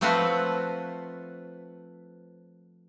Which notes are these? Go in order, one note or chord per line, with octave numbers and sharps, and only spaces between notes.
F3 A3 C4 F4 F#4 B4